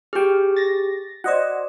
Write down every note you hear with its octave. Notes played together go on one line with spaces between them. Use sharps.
G4 G#4 G5 F6
A6 A#6
F#4 C5 D5 D#5 F#5